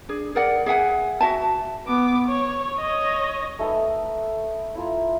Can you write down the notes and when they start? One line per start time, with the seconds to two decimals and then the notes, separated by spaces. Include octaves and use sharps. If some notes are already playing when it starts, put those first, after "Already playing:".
0.09 D4 G#4
0.35 G#4 A#4 D5 F#5
0.66 G#4 E5 F#5 G#5
1.21 F#4 E5 A5
1.87 B3 D6
2.28 C#5
2.79 C#5 D#5
3.59 A3 D#4 A4 B4
4.75 E4 F4 A#5